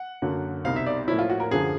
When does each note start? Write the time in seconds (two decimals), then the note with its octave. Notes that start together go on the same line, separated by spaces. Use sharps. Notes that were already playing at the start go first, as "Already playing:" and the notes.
Already playing: F#5
0.22 F#2 D3 F#3 A#3
0.64 C2 B2 G3 C4 D#4 F5
0.76 E5
0.86 D5
1.08 A2 F3 A#3 C#4 E4
1.19 F4
1.30 F#4
1.40 A#4
1.51 F#2 D3 F3 G#4